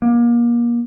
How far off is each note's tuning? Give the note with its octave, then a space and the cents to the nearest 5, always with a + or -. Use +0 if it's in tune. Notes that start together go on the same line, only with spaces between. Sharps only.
A#3 +30